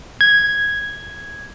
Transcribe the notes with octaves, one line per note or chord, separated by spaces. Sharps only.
G#6